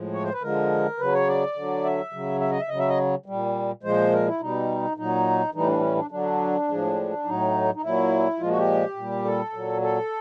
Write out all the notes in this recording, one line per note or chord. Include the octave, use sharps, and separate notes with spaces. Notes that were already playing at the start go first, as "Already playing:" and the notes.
Already playing: A2 F3 G#3
C#5
C5
B4
D3 F3 G#3 A#4
C#3 F#3 B4
C#5
D5
D3 F#3
E5
C#3 F#3
E5
D#5
E5
C#3 F#3 D#5
E5
D#5
A#2 G3
A#2 F3 G#3 C5
A#4
E4
B2 G3 D#4
A#2 F#3 D#4
A2 E3 G3 D#4
D4
C#4
D4
D3 F#3 D4
A2 F3 G#3
A2 F#3 D#4
D#4
A#2 F#3 E4
A#2 F3 G#3 F4
F#4
G4
A#2 G3
A4
A#2 F#3
A4